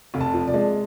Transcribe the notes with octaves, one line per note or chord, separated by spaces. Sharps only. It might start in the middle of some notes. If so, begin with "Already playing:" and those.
F1
A5
F3
D5
G#3